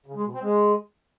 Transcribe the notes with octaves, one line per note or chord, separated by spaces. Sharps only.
C#3
G#3
B2
C4
G#3